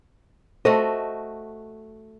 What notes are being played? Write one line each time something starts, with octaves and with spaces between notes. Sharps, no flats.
A3 F#4 A4 C5 D#5